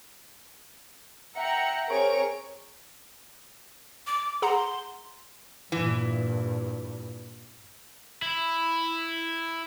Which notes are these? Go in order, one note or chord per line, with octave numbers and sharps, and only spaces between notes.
E5 F#5 G5 A#5 C#7
C4 G#4 A#4 C#5 C#6 D7
D6
G#4 F#5 A#5 C6
G2 A#2 E3
E4